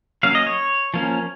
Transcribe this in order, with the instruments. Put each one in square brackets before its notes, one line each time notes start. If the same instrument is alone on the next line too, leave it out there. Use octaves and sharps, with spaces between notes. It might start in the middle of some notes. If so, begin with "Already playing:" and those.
[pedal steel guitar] F#3 A#3 C#4 F5
D#5
C#5
F3 A#3 C#4